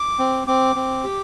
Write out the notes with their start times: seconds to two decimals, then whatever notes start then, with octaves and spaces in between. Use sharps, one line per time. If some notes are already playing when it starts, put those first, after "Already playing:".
Already playing: D6
0.19 C4
0.47 C4 D6
0.76 C4
1.04 G4